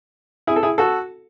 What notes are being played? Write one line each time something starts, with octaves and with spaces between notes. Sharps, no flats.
E4 G#4
A4
E4 G#4
F#4 A4